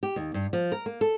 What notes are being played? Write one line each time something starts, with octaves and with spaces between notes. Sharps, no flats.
G4
D#2
G2
F3
A#4
A#3
A4